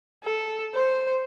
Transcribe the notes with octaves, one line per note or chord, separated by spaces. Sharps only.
A4
C5